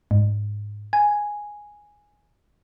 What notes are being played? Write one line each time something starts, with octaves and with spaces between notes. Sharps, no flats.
G#2
G#5